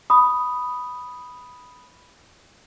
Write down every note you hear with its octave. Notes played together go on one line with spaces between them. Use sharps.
B5 D#6